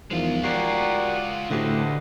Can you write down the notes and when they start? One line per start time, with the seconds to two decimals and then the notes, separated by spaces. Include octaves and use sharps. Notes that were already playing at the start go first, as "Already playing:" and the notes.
0.11 E2 D#3 F3 G#3 F4
0.44 F#4 G4 A#4 D5 C7
1.50 A2 D3 A3 F#4 G4 B4 C5 D#5